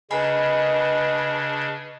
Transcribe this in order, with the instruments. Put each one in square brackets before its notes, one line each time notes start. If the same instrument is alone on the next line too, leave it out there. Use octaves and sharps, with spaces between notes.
[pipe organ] C#3 D4 [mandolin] G#4 A#4 B5 [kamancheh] B4 [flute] D#5